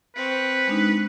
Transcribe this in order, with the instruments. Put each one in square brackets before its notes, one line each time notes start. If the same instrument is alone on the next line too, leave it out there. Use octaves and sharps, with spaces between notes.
[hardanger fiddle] C4 C#6 [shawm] B4
[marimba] G#3 D4 D#4